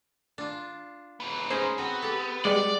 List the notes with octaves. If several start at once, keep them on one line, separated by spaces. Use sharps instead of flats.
D4 F4
G#2 B3
C#4 D#4 G#4 C5
B3 C4 F#4
G4 A4
G3 G#3 D5 F#5